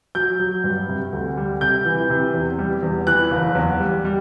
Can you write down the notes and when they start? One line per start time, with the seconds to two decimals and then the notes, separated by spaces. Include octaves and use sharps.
0.15 F#3 G6
0.39 F#3
0.64 G2
0.88 C3
1.13 D2
1.37 G3
1.61 C3 G6
1.85 E3
2.10 C3
2.34 E2
2.59 G3
2.83 E2
3.07 E3 F#6
3.31 F#1
3.55 E2
3.80 G3
4.05 G3